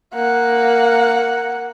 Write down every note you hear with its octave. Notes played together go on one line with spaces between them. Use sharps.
A#3 F#5